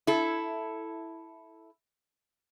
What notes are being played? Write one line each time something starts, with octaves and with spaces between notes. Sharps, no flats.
E4 A4